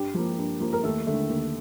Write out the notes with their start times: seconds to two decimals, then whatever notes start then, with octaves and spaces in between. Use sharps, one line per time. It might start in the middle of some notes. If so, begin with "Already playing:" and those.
Already playing: G2 G4
0.14 F3 A#3
0.38 G2
0.60 F3 A#3
0.73 A#4
0.83 D#2 A3 A4
1.07 D3 A3
1.29 D#2